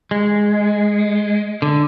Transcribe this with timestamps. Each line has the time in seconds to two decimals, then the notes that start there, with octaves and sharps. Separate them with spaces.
0.11 G#3
1.62 D3